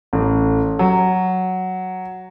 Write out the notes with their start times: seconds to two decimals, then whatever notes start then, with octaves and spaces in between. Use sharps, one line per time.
0.13 A1
0.79 F#3